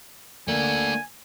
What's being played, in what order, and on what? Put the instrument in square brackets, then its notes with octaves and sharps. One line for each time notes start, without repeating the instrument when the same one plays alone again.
[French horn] D3 [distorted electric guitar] A3 D4 [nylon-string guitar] A#3 [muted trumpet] G#5